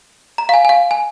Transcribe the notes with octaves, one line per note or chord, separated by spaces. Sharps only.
A#5
F5
G#5
G#5
F5
G#5